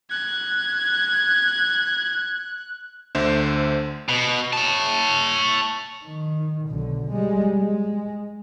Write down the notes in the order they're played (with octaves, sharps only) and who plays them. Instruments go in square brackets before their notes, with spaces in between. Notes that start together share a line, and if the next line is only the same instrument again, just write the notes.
[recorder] F#6 [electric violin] G#6
[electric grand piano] D2 D3 C5 E5
[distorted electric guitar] B2
C#5 A5
[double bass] D#3
B1 D3
G3 G#3
G#3